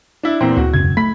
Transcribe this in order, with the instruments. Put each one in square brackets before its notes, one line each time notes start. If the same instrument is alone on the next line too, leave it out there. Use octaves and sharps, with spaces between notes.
[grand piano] D4 E4
E2 A#2 C4
[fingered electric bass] D2 [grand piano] F#4
[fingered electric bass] E1 F#2 C#3 [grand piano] G#6
[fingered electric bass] A3 [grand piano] B5 B6